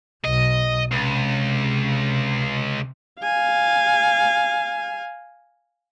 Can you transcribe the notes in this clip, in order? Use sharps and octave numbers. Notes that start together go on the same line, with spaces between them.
B1 D#5
C#2 C3
F5 G#5